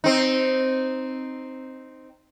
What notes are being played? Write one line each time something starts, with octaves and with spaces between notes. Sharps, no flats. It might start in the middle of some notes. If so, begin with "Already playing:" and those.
C4 D#4